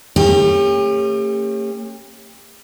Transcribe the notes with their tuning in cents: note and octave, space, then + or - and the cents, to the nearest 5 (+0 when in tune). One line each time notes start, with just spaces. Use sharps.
A3 +45 C#4 -20 G4 +35